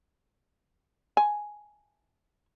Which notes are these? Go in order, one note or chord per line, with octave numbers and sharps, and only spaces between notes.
G#5